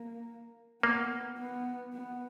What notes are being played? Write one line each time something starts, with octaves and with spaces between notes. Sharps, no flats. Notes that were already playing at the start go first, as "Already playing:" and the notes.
Already playing: A#3
A#3 B3
B3
B3